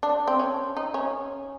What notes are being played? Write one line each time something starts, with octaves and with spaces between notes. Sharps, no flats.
D4
C4
C#4
D#4
C#4